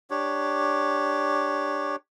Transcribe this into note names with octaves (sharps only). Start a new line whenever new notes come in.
D4 G4 C#5